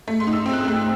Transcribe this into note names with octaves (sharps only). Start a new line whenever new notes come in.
A3
C6
D#4
E6
C4
F#6
E6
A3 F#6